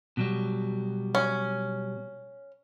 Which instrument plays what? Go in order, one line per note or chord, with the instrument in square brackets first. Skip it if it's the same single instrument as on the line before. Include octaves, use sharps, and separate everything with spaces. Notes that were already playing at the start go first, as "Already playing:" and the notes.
[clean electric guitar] B2 F#3 G3
[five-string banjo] C#4